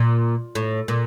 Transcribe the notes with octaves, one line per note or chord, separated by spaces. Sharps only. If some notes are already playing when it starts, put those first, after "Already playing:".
Already playing: A#2
A2
A#2